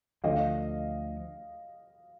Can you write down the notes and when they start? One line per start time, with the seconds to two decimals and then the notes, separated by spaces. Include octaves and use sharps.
0.24 D2 D3 F3 D#5 F5